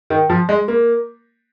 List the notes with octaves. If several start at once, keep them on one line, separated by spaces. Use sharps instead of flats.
D#3
F3
G#3
A#3